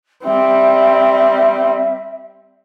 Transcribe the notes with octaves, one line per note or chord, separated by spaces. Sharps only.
G3 C4 E5